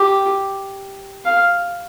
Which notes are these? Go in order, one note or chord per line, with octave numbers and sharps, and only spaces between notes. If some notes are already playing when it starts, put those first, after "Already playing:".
Already playing: G4
F5